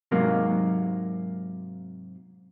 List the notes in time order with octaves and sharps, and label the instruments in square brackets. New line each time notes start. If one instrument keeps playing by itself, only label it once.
[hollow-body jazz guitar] G#2 C3 F#3 A#3